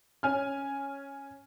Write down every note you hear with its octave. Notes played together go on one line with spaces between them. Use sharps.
C#4 G#5 F6